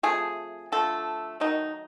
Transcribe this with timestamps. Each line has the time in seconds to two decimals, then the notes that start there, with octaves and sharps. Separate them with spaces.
0.03 C3 F3 A3 G#4
0.72 D3 F3 A3 A4
1.40 D#3 F#3 A3 D#4